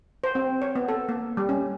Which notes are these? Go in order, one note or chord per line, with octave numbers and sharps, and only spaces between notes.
C5
C4
C#5
B3
A4
A#3
G3
C#4